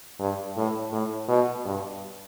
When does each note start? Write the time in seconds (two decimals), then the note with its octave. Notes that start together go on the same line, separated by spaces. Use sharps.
0.20 G2
0.57 A2
0.92 A2
1.29 B2
1.65 G2